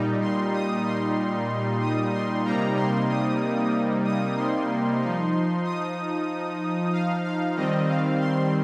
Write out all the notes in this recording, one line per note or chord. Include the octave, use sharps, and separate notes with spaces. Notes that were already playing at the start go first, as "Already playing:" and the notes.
Already playing: A#2 G3 D#4
C6
D#6
C6
D#6
C6
C3 G3 A#3 D#4 A#5
C6
D#6
D#6
C6
F3 D#4
D#6
F5
F5
D#3 G3 C4 D#5
F5
C6